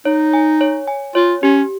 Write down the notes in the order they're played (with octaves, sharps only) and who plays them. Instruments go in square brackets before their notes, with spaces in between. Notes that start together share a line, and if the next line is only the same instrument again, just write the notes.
[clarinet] D#4 [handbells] C#5
[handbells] G#5
C#5
G#5
[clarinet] F4 [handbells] C#5
[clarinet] C#4 [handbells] G4